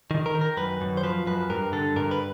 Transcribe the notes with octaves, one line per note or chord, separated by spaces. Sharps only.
D#3
A#4
D#3
A#4
F#2 B4
F#2
C5
F3 B4
F#2 B4
G2 A#4
D3 A4
G2 A#4
B4